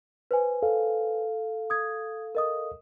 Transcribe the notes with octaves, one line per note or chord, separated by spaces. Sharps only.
B4 C5 G#5
A4 F5
D#6 G#6
A#4 D#5 D#6